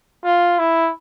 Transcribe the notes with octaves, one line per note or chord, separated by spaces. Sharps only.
F4
E4